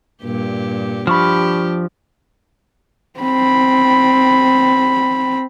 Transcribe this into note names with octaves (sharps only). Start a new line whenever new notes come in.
G2 A#2 G4
F3 D4 G4 B5 C#6 F6
C4 B5